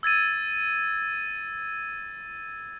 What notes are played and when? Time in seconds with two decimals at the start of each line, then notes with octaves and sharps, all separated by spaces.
0.03 E6 G#6 A6 D#7